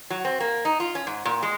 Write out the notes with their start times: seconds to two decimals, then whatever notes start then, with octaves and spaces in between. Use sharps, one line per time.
0.10 F#3
0.25 C4
0.40 A#3
0.65 D#4
0.80 F4
0.95 C#4
1.07 G#2
1.25 A#2
1.43 G#3